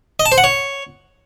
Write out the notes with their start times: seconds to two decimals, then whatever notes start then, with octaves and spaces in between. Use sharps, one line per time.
0.20 D#5
0.26 A5
0.32 C5
0.38 F#5
0.44 C#5